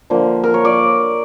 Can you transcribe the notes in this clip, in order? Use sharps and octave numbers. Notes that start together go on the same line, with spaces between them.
D3 F3 A#3
A#4
C#5
D5